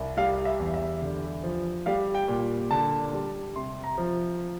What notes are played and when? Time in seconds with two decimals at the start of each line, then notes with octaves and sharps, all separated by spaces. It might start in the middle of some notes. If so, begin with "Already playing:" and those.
Already playing: C2
0.17 G3 F5
0.45 E5
0.59 E2
0.74 E5
1.02 D3
1.44 F3
1.86 G3 F5
2.15 G5
2.28 A#2
2.71 D3 A5
3.13 G3
3.56 C3 C6
3.83 A#5
3.98 F3